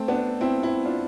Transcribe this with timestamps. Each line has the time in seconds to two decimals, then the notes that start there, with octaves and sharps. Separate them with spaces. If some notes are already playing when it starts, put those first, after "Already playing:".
Already playing: A3 C4
0.08 B3 D4
0.41 C4 E4
0.63 C4 E4
0.85 D4 F4